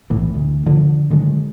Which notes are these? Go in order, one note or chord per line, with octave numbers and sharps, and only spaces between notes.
B1 A2 E3
D2
D3 F3
D3 D#3 F#3 G#3